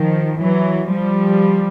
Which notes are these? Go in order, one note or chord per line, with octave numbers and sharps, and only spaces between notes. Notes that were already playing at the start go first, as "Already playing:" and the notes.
Already playing: D#3 F3
E3 F#3
F3 G3